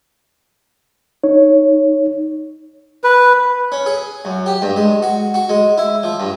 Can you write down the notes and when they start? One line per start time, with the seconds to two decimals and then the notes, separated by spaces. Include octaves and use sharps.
1.24 D#4 C#5
3.04 B4
3.72 C#4
3.86 G#4
4.25 F#2
4.46 G4
4.62 G2
4.76 G#3
5.02 F#4
5.34 F#4
5.49 G#3
5.78 E4
6.03 F3
6.20 G2